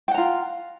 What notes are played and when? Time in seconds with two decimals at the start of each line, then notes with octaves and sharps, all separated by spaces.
0.08 G5
0.11 F#5
0.14 A#5
0.18 F4